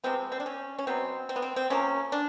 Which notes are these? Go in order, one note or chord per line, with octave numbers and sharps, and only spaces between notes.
C3 F3 G#3 B3 C4
C4
D4
C#4
C#4
B2 F#3 B3 C4
C4
B3
C4
C4
C3 F3 A#3 C#4
D4